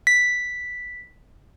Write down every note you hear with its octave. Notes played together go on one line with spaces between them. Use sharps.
B6